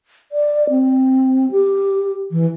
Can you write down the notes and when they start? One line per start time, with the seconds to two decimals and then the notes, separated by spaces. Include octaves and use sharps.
0.32 D5
0.70 C4
1.51 G4
2.31 E3